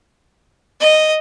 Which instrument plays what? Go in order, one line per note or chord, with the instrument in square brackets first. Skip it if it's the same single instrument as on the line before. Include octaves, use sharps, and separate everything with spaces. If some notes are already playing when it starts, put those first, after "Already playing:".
[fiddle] D#5